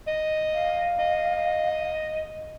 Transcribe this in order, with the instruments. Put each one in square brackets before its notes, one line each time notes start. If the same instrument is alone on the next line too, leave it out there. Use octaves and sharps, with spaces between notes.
[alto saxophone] D#5
[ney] F5
[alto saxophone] D#5